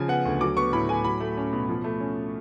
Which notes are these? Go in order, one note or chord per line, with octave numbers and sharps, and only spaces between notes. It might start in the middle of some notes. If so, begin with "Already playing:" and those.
Already playing: C#3 F3 G#5
B3 F#5
D2
F#3 D6
B3 C#6
A2 B5
A2 G#5
F#3 B5
A3
C#4
B2
F3
A3
C#4